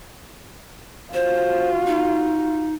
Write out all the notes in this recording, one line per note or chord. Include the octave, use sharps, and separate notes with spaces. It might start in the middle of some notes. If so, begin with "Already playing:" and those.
F4 F#4 C5
D#4